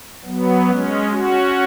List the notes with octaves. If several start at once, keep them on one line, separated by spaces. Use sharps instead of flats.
F#3 B3
G#3 C#4
C#4 F#4